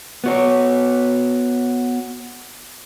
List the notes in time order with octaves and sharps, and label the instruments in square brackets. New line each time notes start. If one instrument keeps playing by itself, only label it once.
[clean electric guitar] B3 F#4 C#5